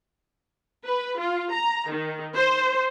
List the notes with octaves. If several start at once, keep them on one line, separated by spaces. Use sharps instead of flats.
B4
F4
A#5
D#3
C5